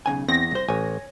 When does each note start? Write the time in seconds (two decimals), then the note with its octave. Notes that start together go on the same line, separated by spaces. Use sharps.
0.06 B1 C#3 G#5
0.28 E2 C4 A#6
0.51 C2 C5
0.68 A1 C#5 G#5